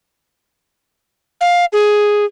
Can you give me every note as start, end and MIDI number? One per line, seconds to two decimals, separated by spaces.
1.41 1.65 77
1.73 2.25 68